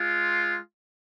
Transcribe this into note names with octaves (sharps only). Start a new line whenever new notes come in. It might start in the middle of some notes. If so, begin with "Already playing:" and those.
Already playing: G#3 F4